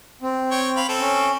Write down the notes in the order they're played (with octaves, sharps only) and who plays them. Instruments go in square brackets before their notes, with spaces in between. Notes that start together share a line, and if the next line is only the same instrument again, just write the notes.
[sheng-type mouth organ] C4
[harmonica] C#5 G5
F5 B5
C4 A4
[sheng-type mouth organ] C#4